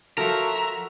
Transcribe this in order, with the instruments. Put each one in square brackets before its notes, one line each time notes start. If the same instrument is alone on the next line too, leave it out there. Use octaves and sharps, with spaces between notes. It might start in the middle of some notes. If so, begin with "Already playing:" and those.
[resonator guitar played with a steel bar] F3 F#4 A4 [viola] F#3 E5 [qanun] A#4 [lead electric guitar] A#5